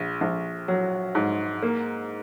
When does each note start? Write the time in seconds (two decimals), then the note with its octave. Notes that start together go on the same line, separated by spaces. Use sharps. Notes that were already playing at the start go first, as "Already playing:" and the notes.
Already playing: A#1
0.21 A#1
0.68 F#3
1.15 G#2
1.63 A#3